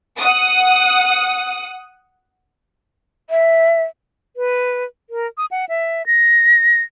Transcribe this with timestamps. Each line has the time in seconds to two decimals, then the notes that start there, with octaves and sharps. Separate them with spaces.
0.18 F#5 D#6
3.30 E5
4.36 B4
5.10 A#4
5.38 D#6
5.51 F#5
5.69 E5
6.06 A#6